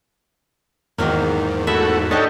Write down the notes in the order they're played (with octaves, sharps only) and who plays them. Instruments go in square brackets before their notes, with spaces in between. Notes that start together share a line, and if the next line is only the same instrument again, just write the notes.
[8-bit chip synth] E2 G#2 [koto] D#3 F#3 A#3
[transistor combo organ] A3 F#4 [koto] E4 E5
[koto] D4 G4 [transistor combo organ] D#4 A4 C#5